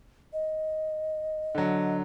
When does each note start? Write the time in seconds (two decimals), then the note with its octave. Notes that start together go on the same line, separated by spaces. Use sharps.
0.33 D#5
1.55 D3 F#3